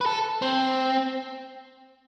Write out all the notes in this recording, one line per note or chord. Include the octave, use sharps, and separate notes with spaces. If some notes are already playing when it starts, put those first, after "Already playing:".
B4
A4
C4